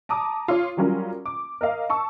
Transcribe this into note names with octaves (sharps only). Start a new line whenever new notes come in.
A5 A#5 D6 D#6
F4 C#5
F#3 G3 C#4 F4 A#4
D6
A#4 D#5 F5
A5 C#6 E6